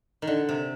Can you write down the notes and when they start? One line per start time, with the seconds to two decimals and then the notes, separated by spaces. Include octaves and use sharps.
0.22 D#3
0.27 D3
0.49 C3